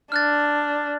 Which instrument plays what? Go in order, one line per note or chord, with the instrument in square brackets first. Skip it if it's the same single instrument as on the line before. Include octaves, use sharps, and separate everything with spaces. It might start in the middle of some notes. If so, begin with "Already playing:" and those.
[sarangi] D4 [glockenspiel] F6 F#6 A6